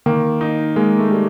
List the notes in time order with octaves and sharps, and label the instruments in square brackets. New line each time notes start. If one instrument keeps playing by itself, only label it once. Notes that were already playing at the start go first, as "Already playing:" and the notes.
[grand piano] D#3 [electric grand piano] A#3
[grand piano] D#4
[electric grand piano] G#3 [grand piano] A#3
[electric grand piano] A3
[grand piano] G3